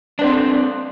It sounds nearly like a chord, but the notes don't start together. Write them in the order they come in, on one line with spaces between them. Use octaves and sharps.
D4 B4 C4 C5 A4